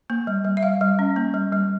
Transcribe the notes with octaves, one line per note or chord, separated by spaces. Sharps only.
A#3
G3
G3
E5
G3 F5
G3
C#4
A#3
G3
G3